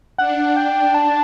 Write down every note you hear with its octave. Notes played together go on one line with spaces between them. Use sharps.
D4 F#5
G5
A5